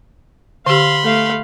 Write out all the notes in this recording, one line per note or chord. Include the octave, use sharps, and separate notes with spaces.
D3 G4 F5 B5 C6
A3 F5